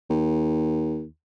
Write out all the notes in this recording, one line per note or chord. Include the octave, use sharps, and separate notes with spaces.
D#2